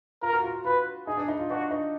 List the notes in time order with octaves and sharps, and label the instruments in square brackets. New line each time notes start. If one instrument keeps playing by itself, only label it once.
[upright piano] F4 [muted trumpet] A#4
[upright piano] F#4
F4
F4
[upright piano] F4 [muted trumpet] B4
[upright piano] D#4 [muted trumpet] G#4
[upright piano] D4
D#4
F4
[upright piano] D4 [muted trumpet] F#4
[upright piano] D#4